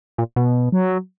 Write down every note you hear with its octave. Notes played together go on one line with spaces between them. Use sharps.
A#2
B2
F#3